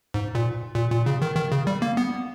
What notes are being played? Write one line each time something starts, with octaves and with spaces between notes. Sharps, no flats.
G#2
A#2
A#2
A#2
C#3
D#3
D#3
C#3
G3
A#3
B3